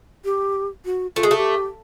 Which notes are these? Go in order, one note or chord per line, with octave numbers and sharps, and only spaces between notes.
G4
F#4
A3 F4
G#3
F#4
A3
G4